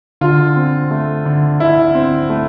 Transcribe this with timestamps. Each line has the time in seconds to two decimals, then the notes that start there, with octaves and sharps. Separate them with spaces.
0.21 D3 F4
0.56 C4
0.91 A3
1.25 D3
1.60 D3 E4
1.95 C4
2.30 A3